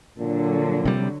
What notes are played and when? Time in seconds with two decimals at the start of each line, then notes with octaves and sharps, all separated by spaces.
0.19 A#2 D3 F#3
0.85 C3 G3